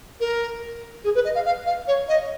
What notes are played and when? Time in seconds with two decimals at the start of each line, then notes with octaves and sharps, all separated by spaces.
0.20 A#4
1.04 G#4
1.15 B4
1.25 D#5
1.35 F5
1.45 F5
1.66 F5
1.87 C#5
2.08 D#5